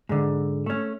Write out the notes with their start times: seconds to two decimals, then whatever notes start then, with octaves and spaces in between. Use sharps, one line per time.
0.09 G#2 D3
0.66 A3 C#4